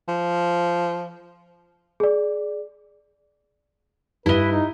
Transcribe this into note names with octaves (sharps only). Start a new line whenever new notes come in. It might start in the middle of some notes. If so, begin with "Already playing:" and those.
F3
G#4 D5
G2 E4 B4 D#5 G7
D#4